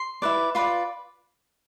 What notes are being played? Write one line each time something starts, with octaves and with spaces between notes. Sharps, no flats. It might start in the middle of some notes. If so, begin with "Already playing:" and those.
Already playing: C6
E4 B4 D5
F4 B4 D5 B5